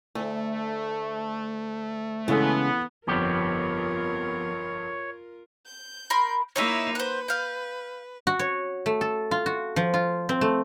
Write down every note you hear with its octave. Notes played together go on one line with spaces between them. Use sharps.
D2 A3
C#3 E3 G#3 B3 A4
G1 F2 F3 B3 F4 G4 A#4 C#5
G6
A#4 B5 C6
A#3 D#4 E4 C#5 D#5 E5
B4 C5 F#5
F5 G5
F#4
C#5
A3
A4
F4
F#4
F3
F4
C4
A3